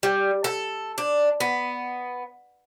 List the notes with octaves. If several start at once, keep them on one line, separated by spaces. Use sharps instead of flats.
G3
A4
D4
B3